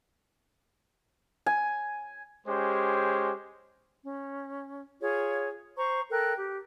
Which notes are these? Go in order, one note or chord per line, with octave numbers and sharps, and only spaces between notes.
G#5
G#3 C#4 G4 C5
C#4
F4 G#4 C#5
C5 A#5 C#6
A4 A#4 G5 F#6
G4